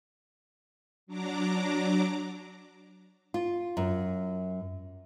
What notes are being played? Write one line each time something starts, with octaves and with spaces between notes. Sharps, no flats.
F#3 D4 A#5 D6
F4
F#2